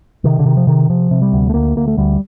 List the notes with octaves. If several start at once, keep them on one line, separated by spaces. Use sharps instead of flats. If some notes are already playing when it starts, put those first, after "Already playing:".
C3 D#3
D3
C3 D#3
F3
C3 D#3
C3 F3
C3
G3
D2
A3
D2 A#3
D2 A#3
A3
D2 G3